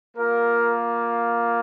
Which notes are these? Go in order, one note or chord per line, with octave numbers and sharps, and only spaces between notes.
A#3 F4 A#4